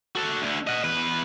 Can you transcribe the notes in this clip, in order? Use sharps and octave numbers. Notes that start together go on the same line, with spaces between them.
F#4 A4
D2 D3
D#5 F#5
E2 B4